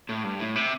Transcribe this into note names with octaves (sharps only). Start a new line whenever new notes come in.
A2
G2
A2
C3